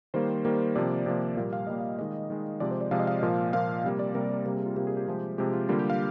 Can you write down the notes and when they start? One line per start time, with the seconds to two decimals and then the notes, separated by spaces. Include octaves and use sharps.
0.14 D#3 G3 A#3 C5
0.45 D#3 G3 A#3
0.75 C3 F3 A#3 D5
1.06 C3 F3 A#3
1.37 A#2 G3 A#3 F5
1.53 F5
1.67 A#2 G3 A#3 D#5
1.80 F5
1.99 D#3 G#3 D#5
2.30 D#3 G#3
2.60 C3 F3 G#3 D5
2.71 C5
2.81 D5
2.91 C3 F3 G#3 F5
2.99 D#5
3.07 F5
3.22 A#2 F3 A#3
3.53 A#2 F3 A#3 F5
3.84 C3 G3 A#3
3.99 D5
4.15 C3 G3 A#3 A#4
4.30 A#4
4.45 C3 G3 A#3 A#4
4.56 G#4
4.66 F4
4.76 C3 G3 A#3 G4
4.87 G#4
4.97 G4
5.08 C3 F3 G#3
5.38 C3 F3 G#3 G4
5.53 F4
5.69 D3 G3 A#3 F4
5.79 G4
5.90 F5